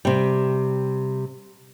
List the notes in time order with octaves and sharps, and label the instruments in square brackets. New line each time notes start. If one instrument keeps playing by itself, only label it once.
[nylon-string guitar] C3 G3